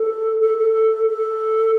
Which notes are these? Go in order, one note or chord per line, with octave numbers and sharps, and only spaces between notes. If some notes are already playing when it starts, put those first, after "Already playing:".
Already playing: A4
A4
A4
A4